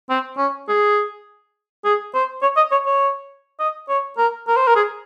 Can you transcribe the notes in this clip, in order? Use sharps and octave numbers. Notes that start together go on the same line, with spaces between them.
C4
C#4
G#4
G#4
C5
C#5
D#5
C#5
C#5
D#5
C#5
A#4
A#4
C5
A#4
G#4